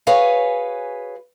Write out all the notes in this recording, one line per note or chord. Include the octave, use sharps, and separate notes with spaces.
F#4 G#4 B4 C#5 F5 G#5